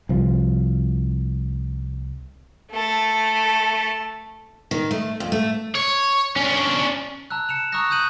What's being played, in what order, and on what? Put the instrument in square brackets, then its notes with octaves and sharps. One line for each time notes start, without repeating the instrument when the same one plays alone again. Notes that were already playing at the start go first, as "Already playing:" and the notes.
[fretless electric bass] C2 F3
[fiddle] A3 A4
[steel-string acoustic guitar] D#3
A3
F2
A3
[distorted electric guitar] C#5
[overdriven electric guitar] C#4 D4
[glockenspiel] A5 A#5 E6 F#6
A5 C#7 E7 F7
A#5 C#6 D#6 E6 F#6 A#6
D#6 F#6 G6 D#7 F#7